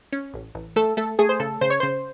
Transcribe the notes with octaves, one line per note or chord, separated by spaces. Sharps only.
C#4
A1
A1
A3 A4
A3 A4
A3 G#4
C5
C#3 A4
C#3 C5
C#5
C#3 C5